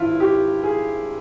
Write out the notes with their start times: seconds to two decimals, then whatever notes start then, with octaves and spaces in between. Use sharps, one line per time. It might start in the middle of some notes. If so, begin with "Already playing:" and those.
Already playing: G#1 G2 D#3 E4 F4
0.20 G4
0.63 G#4